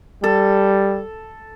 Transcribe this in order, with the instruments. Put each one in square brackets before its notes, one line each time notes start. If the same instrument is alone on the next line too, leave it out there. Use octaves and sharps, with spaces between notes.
[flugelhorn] G3 [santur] A4